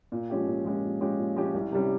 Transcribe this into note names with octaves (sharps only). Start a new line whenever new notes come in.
A#2
F3 G#3 C#4 G4
A#2
F3 G#3 C#4 G4
A#2
F3 G#3 C#4 G4
A#2
F3 G#3 C#4 G4
C2
C3 G3 C#4